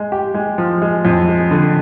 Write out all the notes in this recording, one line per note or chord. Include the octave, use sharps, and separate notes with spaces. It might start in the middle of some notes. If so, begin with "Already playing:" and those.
Already playing: G#3
G4
G#3
F3
G#3
F2
G#3
D3